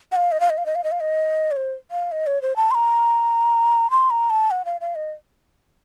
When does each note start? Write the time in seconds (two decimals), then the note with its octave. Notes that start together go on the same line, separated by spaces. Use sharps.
0.12 F#5
0.16 F5
0.32 D#5
0.40 F5
0.50 D#5
0.58 F5
0.66 D#5
0.75 F5
0.84 D#5
0.92 F5
1.00 D#5
1.51 C#5
1.56 C5
1.91 F5
2.12 D#5
2.27 C#5
2.42 C5
2.56 A5
2.71 C6
2.75 A#5
3.91 C6
4.10 A#5
4.30 A5
4.51 F#5
4.65 F5
4.81 F5
4.95 D#5